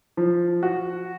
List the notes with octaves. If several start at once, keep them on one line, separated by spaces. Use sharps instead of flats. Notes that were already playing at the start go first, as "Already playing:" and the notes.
F3
F#4